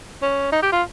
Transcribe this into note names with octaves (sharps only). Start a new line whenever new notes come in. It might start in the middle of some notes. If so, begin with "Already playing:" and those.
C#4
D#4
G4
F4